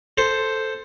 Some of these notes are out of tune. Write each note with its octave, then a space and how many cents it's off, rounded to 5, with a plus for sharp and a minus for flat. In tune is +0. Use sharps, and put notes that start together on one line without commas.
A4 +0 C5 +0